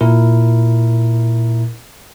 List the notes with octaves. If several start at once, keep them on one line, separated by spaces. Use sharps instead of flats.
A#2 E4 A#4